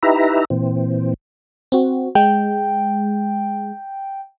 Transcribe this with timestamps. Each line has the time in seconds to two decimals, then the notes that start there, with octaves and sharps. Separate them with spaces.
0.03 D#4 E4 G4 B4 E5 A#5
0.50 A#2 E3 C4
1.72 C4 F#4
2.15 G#3 G5